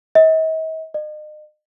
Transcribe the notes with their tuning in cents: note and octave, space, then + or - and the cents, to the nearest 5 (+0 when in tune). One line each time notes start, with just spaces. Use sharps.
D#5 +45
D#5 -40